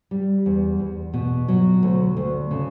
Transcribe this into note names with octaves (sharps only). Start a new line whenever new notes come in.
G3
E2
E2
B2
F#3
D2
D2
C#3